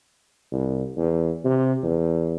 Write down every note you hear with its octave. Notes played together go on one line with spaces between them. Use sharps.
C2
E2
C3
E2